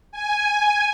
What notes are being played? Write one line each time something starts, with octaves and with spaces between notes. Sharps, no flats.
G#5